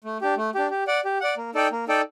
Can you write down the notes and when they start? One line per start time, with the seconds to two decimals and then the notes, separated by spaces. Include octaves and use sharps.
0.04 A3
0.21 D4 G4
0.37 A3
0.55 D4 G4
0.70 G4
0.87 D5 F#5
1.05 G4
1.21 D5 F#5
1.37 A#3
1.55 D#4 A4 D5 G5
1.71 A#3
1.88 D#4 A4 D5 G5